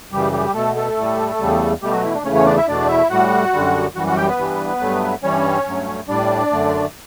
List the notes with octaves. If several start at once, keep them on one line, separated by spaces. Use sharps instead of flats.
F#2 C#3 E3 G3 G4
G3 G4
B2 A3 A4
A3 A4
A2 G3
E2 C#3 G3
B2 G3 A3 G4
F#3 F#4
E3 E4
D4
E2 C#3 E3 A3 C#4 C#5
C#4 C#5
D4 D5
E4 E5
E2 B2 A3 D4 D5
E4 E5
A2 G3 F#4 F#5
F#2 D3 G3
F#2 E3 G3 F#4 F#5
F#4 F#5
G4 G5
B3 B4
G2 E3 G3
G2 F#3 A3
G2 E3 G3 C#4 C#5
G2 F#3 A3
A2 G3 D4 D5
F#2 D3 A3